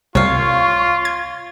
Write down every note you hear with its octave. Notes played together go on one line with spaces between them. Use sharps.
C2 F4 C#5 F5 C#6
G#6